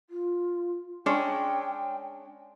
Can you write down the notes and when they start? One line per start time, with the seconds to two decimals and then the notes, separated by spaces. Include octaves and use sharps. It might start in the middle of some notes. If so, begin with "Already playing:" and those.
0.10 F4
1.06 G#3 C#4 D4 C#5 G5